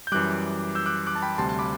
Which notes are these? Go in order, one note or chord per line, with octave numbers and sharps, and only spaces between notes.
G6
F#2 E3 G3 D6 F#6
E6 G6
D6 F#6
D6 F#6
A5
G5 B5
D2 C3 G3 A5 C6
A5 C6
B5 D6